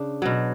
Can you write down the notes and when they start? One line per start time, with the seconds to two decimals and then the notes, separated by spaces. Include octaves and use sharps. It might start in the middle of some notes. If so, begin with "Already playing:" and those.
Already playing: C#3 D4
0.22 B2 F#3